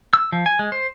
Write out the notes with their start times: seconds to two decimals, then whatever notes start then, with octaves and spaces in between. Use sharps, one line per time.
0.13 E6
0.32 F3
0.46 G#5
0.59 G#3
0.72 C5